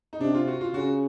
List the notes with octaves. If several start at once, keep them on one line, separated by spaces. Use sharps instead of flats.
D#4
C3 D4
F4
F#4
F4
C#3 F#4